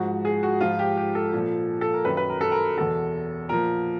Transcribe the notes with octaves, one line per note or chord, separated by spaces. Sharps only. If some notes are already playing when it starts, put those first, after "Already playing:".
Already playing: G#2 F3 F#4
G#4
F#4
G#2 F3 F4
G4
G4
A4
A#2 F3
A4
A#4
F#2 D#3 B4
B4
A#4
A4
A#4
E2 B2 A4
A#2 F3 A#4